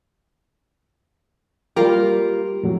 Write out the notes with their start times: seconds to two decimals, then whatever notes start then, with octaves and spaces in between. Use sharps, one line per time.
1.76 G3 A#3 F4 G4 A#4
2.63 F2 A2 F#3